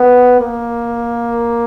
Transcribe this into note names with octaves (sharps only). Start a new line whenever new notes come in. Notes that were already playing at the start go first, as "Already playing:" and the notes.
Already playing: B3
A#3